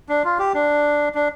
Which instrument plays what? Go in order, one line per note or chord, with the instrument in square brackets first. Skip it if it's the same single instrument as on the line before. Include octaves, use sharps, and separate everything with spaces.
[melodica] D4
F4
G4
D4
D4